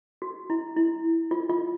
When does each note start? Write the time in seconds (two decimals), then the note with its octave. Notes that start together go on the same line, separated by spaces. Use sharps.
0.22 F#4
0.50 E4
0.77 E4
1.31 F4
1.49 F4